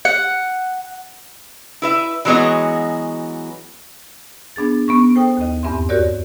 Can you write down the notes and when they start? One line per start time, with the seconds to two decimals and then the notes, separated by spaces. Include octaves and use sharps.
0.05 F#5
1.82 E4 B4 E5
2.25 E3 F#3 G#3 B3 F#4 D#5
4.56 B3 D4 G#4 A6
4.88 B3 C#4 C#6
5.15 A4 C5 G5 D#6
5.37 D#2 D#5
5.63 E2 G2 C4 E5 C6
5.89 F#4 G4 A#4 C#5 D5